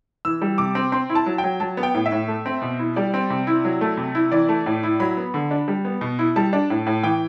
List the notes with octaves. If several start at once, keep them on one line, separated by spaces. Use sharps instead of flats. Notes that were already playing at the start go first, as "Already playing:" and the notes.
E3 E6
G3
C3 D6
C4
C4 C6
E4
A5
F#3
G5
F#3
F#3 A5
B3
G5
A2
E5
A2
A3
C4
B2
E4
G3 D5
C4
C3
E4
F#3
A3
C3
E4
E3 D5
A3
A2
E4
F#3 B5
B3
D3
D4
G3
B3
B2
E4
G3 A5
D4
A2
A2
E3 G5